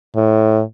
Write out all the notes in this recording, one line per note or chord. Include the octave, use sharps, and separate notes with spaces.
A2